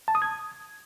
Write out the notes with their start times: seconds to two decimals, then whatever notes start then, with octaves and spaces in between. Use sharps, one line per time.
0.08 A5
0.15 D#6
0.22 G#6